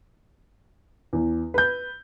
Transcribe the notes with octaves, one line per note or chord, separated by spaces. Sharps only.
E2
B4 G6